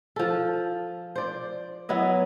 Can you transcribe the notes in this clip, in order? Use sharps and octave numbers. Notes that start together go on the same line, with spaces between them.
F3 A4
C5 D5
F#3 B3 E4 D#5